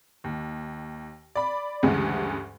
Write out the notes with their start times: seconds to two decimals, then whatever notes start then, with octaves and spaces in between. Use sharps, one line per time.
0.24 D#2
1.35 D5 B5
1.83 D2 G2 C#3 E3 G#3